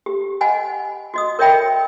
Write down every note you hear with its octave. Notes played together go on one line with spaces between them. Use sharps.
G4
D#5 F#5 G#5 B5
F#4 D#5 D#6
A#4 C#5 D#5 E5 G5 B5